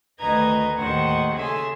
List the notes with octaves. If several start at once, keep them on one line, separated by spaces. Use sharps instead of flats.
D2 D#3 B4 D#5 A#5 G#6
D#2 A2 D#3 C5 F#5 C#6
C#3 G#4 A4 E5 C6